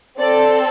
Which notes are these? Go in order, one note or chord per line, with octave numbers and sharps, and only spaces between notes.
C4 A4 D5